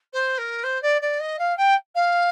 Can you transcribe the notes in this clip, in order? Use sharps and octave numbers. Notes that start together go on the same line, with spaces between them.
C5
A#4
C5
D5
D5
D#5
F5
G5
F5